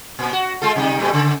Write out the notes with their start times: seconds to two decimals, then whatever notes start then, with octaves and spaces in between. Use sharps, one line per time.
0.19 A#2
0.33 F#4
0.62 G#3 F4 A4
0.76 C3 G3 D#4
0.99 A#2 G3 A3
1.13 C#3 A4